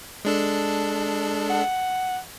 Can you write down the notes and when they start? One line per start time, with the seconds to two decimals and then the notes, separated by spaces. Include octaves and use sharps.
0.25 G#3 D4 A4
1.50 F#5